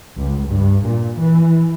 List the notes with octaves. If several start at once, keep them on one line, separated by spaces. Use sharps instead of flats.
C#2
G2
A#2
E3